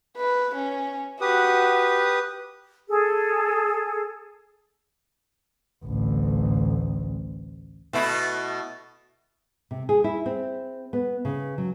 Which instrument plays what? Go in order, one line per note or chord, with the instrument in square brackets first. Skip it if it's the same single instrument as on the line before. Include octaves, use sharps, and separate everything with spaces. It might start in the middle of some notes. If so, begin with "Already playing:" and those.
[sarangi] B4
C#4
[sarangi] F#4 [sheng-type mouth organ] G4 B4 D#6
[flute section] G#4 A4
[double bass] A1 D2
[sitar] B2 A3 E4
[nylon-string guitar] C3
G#4
E4
C4
B3
C#3
F#3